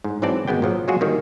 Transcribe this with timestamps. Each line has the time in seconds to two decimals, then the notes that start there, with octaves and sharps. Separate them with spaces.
0.04 G#2
0.22 G#2 E3 F#3 C4 D5 A5
0.48 G#1 G#3 B3 G5
0.62 A#2 F3 F#3
0.88 F#3 G#3 F4 F#4 G#4
1.01 D#3 G3 A#3